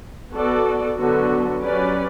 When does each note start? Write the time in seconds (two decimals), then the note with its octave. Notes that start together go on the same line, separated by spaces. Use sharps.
0.31 B3 F#4 A4 D5
0.97 D3 F#3 B3 F#4 A4
1.61 F#3 C#4 G4 B4 D5